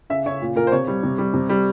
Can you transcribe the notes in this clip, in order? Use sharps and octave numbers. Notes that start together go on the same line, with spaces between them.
C#3 E5
C#3 C#5
A#2
A#2 A#4
C5
C3 C#5
G3
C3
G3
C3
G3